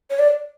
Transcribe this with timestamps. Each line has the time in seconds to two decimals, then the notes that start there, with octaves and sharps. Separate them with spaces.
0.10 C#5
0.19 D5